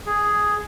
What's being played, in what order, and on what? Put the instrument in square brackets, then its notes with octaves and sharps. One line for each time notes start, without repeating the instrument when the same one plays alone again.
[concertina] G#4